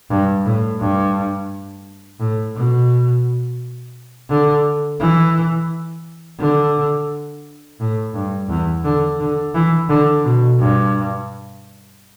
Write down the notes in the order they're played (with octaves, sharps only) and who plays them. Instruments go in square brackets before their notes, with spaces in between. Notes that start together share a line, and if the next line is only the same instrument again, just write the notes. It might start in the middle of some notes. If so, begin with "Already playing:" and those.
[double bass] G2
A2
G2
A2
B2
D3
E3
D3
A2
G2
E2
D3
D3
E3
D3
B2
G2